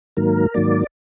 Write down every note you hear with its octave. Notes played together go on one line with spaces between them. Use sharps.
G#2 D#3 F#3 A#3 A#4
G#2 D#3 F#3 A#3 D5